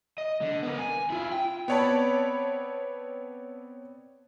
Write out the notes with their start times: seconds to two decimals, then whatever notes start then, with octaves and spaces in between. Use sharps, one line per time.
0.18 D#5
0.41 D3
0.63 B3 A#4
0.78 G#5
1.10 E4 F4
1.32 G5
1.68 B3 C4 C#5 D5 A5 B5